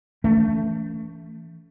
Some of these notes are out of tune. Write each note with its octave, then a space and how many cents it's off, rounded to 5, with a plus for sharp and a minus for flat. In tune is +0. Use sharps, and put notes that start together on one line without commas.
E3 +0 A3 +0 C#4 +35